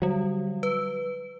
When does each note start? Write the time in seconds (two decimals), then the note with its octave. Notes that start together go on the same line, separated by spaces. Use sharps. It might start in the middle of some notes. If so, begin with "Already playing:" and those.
0.02 D3 F#3 G3
0.63 B4